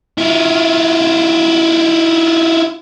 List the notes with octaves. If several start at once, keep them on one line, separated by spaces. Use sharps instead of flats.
E4 F4